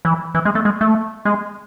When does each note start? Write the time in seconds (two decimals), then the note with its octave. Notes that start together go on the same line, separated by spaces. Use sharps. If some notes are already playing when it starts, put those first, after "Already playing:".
0.05 E3
0.35 E3
0.45 G#3
0.55 A3
0.65 G#3
0.81 A3
1.25 G#3